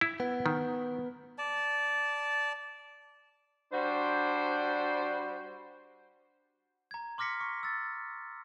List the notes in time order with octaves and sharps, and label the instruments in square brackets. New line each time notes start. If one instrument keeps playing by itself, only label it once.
[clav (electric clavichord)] E4
[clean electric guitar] B3
[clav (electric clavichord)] D#3
[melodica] D5 A5
[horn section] G3 D4 F#4 C5
[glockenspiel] A#5 G#6
C6 D6 F6 A#6 B6 C#7
C#6
E6 A6